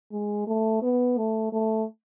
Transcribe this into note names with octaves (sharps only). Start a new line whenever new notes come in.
G#3
A3
B3
A3
A3